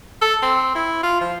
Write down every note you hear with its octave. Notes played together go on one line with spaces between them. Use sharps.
A4
C4
E4
F4
F3